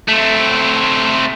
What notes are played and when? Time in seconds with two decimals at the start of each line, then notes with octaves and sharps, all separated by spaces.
0.08 A3 C4